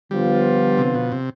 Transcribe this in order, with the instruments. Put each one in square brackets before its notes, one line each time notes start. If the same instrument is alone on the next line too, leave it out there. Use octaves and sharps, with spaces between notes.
[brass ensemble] D3 F3 B3 F4 [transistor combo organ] G3
[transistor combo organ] C3
B2
C3